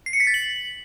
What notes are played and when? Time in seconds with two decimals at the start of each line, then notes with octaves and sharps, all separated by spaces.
0.06 C7
0.13 C#7
0.20 B6
0.27 A6
0.34 F#7